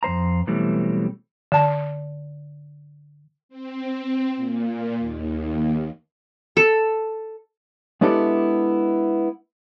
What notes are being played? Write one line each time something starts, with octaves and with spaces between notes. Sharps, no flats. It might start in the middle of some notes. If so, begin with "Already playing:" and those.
F2 G3 C5 A#5
B2 E3 F#3 G3 A3 C4
D3 A5
C4
A#2
D#2
A4
G#3 B3 D4 E4 G4 A4